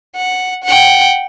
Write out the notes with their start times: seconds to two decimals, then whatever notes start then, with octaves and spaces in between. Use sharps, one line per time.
0.16 F#5
0.64 F#5 G5